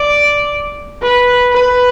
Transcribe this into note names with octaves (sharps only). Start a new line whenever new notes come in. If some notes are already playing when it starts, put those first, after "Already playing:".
Already playing: D5
B4
B4